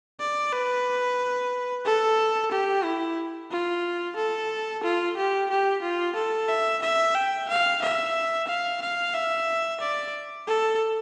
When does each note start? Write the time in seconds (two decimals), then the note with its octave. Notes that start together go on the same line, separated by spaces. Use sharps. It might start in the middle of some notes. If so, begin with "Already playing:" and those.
0.20 D5
0.52 B4
1.85 A4
2.51 G4
2.85 E4
3.51 F4
4.16 A4
4.83 F4
5.17 G4
5.50 G4
5.82 F4
6.15 A4
6.48 E5
6.82 E5
7.15 G5
7.49 F5
7.82 E5
8.47 F5
8.81 F5
9.14 E5
9.80 D5
10.47 A4